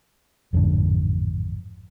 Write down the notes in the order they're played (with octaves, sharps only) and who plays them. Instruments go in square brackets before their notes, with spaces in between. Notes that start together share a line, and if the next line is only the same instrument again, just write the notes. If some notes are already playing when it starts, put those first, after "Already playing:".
[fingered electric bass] A1 F2 G#2 D3